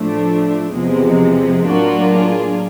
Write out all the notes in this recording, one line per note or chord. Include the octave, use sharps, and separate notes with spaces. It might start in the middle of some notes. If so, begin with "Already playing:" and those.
Already playing: A2 F3 A3 D4
E2 C3 F3 G#3
A2 F#3 A#3 D4 F4 F#4
G#4